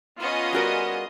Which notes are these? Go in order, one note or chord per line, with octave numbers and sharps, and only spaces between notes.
B3 C#4 F4 G#4 D#5
G3 F#4 A#4